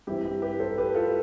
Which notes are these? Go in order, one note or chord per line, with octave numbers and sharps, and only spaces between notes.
G2 E3 G3 C4 E4 G4
E4 G4
G4 B4
A4 C5
A4
G4 B4
F4 A4